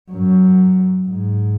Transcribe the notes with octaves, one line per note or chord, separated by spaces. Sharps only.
F#2
G#2